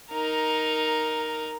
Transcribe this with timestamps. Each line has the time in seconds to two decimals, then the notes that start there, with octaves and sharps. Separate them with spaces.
0.12 D#4 A#4